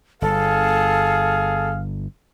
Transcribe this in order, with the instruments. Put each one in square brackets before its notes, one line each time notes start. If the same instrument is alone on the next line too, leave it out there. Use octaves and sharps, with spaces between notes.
[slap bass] G1 [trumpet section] G#4 F5 [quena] A4